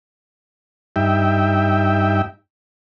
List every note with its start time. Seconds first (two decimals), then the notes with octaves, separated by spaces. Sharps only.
0.96 G2 D#4 E5 G5